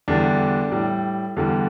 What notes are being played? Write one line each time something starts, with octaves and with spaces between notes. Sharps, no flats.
E2 D3 G3 D4
A2 G3
E2 D3 G3